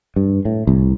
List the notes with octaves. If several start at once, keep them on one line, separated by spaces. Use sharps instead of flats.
G2
A2
C2